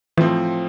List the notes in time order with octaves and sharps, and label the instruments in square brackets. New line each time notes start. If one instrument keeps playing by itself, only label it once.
[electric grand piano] A2 F3 C4 [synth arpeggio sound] E3